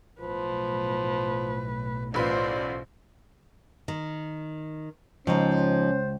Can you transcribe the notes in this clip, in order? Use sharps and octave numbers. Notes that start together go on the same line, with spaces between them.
B1 A2 F3 B4
A1 F4 B4 C5 D5
D#3
C#2 F3 C#4 D#4 C5